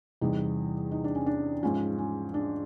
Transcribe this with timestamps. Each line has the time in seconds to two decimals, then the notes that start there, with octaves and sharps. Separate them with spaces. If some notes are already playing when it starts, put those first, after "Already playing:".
0.21 E2 C3 E3 G3 D#4
0.91 D#4
1.04 D4
1.15 C#4
1.26 D4
1.63 G#2 F3 C#4
1.98 C#4
2.34 D4